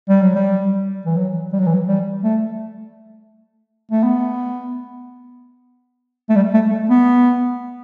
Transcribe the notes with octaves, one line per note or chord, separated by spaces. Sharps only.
G3
F#3
G3
E3
F#3
G3
F#3
E3
F#3
G3
A3
A3
B3
A3
G3
A3
A3
B3